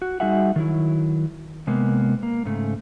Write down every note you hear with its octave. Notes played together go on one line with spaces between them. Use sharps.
F#4
G3 D#4 F#4 G#4 E5 F#5
D#3 F#3 E4
C3 G#3 A#3 B3
A#3
G#2 C#3 A3